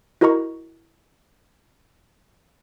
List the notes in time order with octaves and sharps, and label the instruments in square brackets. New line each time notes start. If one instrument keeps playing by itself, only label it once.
[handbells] E4 F#4 A#4 D#5 A#5 C#6